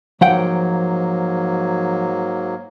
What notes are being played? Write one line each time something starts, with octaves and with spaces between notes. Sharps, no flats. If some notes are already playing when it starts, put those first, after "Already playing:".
G#2 F3 F#3 A#3 F#5 G5